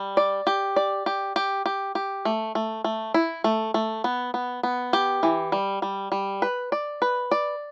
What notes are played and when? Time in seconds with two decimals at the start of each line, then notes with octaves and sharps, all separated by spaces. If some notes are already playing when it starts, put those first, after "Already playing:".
Already playing: G3
0.17 D5
0.47 G4
0.76 D5
1.06 G4
1.36 G4
1.66 G4
1.95 G4
2.25 A3
2.55 A3
2.84 A3
3.14 E4
3.44 A3
3.74 A3
4.04 B3
4.34 B3
4.63 B3
4.93 G4
5.23 E3
5.52 G3
5.82 G3
6.12 G3
6.42 B4
6.72 D5
7.02 B4
7.31 D5